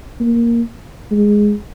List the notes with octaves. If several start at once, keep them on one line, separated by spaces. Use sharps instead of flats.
A#3
G#3